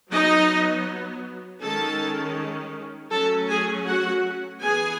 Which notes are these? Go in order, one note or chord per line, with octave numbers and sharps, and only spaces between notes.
F#3 B3 D#4 D#5
D#3 G#3 C#4 A4 A5
F#3 A3 C#4 A4 A5
G#4 G#5
F#4 F#5
E3 B3 G#4 G#5